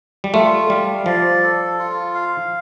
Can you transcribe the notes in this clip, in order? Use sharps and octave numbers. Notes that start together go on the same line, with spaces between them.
G3
A3 F4
G3 F5
F3 D5
A4
F4
F5